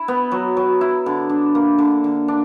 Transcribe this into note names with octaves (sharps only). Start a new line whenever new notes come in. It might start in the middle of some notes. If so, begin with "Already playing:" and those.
Already playing: E4
B3
F#3
F#3
E4
D3
D4
A#3
D3
D3
D4